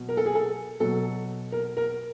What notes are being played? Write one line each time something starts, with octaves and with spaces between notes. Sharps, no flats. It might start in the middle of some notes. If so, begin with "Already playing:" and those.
Already playing: B2 F#3
A#4
A4
G#4
A4
B2 F#3 A4
A#4
A#4